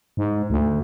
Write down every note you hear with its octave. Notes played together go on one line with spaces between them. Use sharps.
G#2
D2